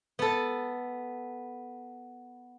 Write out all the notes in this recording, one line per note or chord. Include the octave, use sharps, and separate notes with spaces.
B3 A4